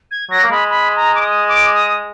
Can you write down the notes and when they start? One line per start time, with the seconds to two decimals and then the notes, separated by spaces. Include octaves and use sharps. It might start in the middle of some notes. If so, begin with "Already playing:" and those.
0.11 G#6
0.31 F#3 A#6
0.43 A#3
0.50 G#3 B5
0.70 B5
0.96 A#5
1.15 D6
1.22 D#6
1.48 D6
1.74 D#6